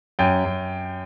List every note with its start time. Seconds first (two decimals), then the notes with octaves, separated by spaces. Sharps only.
0.19 F#2 G5
0.44 F#2